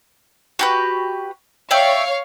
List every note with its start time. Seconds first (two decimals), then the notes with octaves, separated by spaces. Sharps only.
0.59 F#4 G4 B4
1.71 C#5 D5 E5 F5 G5